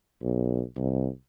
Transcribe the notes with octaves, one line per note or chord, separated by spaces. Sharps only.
B1
C2